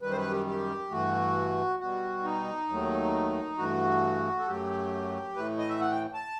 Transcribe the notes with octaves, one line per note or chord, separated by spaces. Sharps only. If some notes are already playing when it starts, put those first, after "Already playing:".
F#2 D#3 G3 B4
C5
B4
G4
G4
G2 E3 A3 F#4
B2 G3 F#4
D#4
D#2 D#3 F#3 A3
G2 E3 A3 F#4
A4
F#2 F#3 A3 G4
A2 E3 A3 B4
D#5
E5
F#5
G5
A5